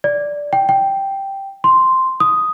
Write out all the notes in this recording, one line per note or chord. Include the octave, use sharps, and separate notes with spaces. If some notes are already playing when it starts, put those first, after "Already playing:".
D5
G5
G5
C6
D#6